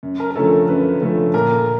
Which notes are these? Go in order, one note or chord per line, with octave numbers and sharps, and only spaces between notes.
F#2
A#4
A#4
D3 F3 A3 C#4 A4
F#2 B4
D3 F3 A3 C#4
A#2 A#4